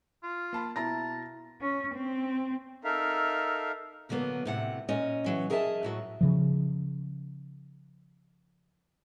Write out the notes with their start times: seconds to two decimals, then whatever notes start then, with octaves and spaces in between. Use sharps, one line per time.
0.23 F4
0.53 A#3 A5 B5
0.76 B2 E4 A5 A#5 A#6
1.61 C#4
1.95 C4
2.84 D#4 A4 A#4 E5 F5
4.09 B2 D3 F#3 A#3 B3
4.45 A2 C3 F#5
4.89 A#2 C#4 D#5
5.24 E3 F#3 C#4
5.50 G#4 A#4 D#5 E5 G#5 A5
5.83 A2 F#3 F#4
6.21 C#3 F3